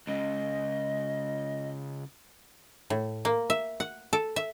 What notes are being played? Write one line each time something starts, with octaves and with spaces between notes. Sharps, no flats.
C#2 C#3 D#5
A2
A#3
E5
F#5
A4
E5